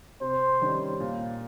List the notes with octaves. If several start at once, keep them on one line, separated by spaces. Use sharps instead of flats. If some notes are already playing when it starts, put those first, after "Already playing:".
C3 C5
D#3 G3 C#4
A#2